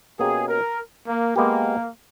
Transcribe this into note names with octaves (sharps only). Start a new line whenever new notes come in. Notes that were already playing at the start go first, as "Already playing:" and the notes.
B2 A#3 C#4 G4 G#4
A#4
A#3
G#3 A#3 B3 G4